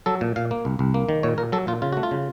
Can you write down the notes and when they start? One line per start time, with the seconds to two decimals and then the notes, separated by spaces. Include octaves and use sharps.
0.06 F#3 A4
0.21 A#2
0.36 A#2 F5
0.51 A#3
0.65 C2
0.79 C2
0.94 A#3
1.09 D#3
1.23 A#2 C#5
1.38 A#2 A#4
1.52 F#3 A4
1.67 A#2 F4
1.82 C#3 F4
1.93 A3 F#4
2.03 F4
2.11 C#3